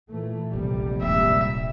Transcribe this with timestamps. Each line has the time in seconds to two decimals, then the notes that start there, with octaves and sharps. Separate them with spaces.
0.10 A#2 E3 A3
0.53 A#1 E2 C3 G3 A3
1.02 D#1 G#1 E5